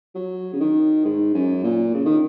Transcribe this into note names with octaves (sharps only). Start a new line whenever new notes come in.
F#3
C#3
D#3
G#2
F#2
A#2
C#3
D#3